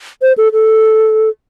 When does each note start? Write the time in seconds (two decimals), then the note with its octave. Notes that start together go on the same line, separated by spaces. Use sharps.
0.22 C5
0.37 A4
0.53 A4